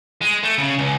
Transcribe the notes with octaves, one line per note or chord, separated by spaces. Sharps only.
G#3
A3
C#3
C#2